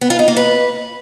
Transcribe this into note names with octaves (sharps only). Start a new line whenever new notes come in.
B3
F4
D#4
A#3
B4